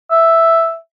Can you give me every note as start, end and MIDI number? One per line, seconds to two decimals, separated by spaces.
0.11 0.75 76